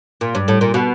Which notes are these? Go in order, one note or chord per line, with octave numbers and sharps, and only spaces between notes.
A#2
G2
A2
A#2
B2